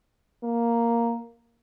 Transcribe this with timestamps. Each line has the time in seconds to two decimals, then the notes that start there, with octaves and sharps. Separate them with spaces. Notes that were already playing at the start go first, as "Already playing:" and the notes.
0.43 A#3